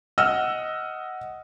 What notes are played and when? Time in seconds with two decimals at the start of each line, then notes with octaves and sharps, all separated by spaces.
0.18 D#5 F#5 E6 F6